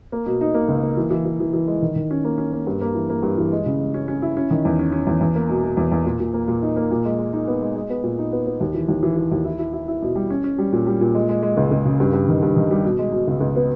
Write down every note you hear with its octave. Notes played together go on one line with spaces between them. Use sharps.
A#3
B2
D#4
A#3
C#2
A#3
E3
E3
E3
E3
E3
G#3
D#3
D#3
C#4
A#3
C#4
A#3
G2
A#3
E3
A#3
G2
E3
G#3
C#3
G#3
C#4
C#4
E4
C#4
D#3
E2
C#4
C#4
E2
E2
A#3
B2
B2
E2
E2
A#2
A#2
A#3
A#2
D#4
A#3
A#2
G#3
G#3
D#4
B3
G#3
G#3
B3
A#2
D#4
B3
B3
D#2
E3
D#2
E3
E3
D#2
E4
E4
E4
E4
B2
G3
C#4
C#4
G3
A#2
G3
A#2
G#3
G#3
G#3
C#2
C#2
C#3
G2
G2
D#3
G2
D#3
G3
B2
G#3
B2
C#2
C#2
B3